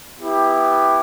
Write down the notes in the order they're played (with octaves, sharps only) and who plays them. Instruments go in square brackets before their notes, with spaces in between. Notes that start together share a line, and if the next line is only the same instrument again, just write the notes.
[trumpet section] B3 E4 G4